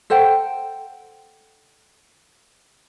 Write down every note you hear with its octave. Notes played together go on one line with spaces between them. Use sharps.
A4 C5 F#5 G5